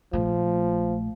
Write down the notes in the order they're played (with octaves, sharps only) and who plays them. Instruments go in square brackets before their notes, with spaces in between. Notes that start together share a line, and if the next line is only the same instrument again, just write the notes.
[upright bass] A#1 A3 [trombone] F3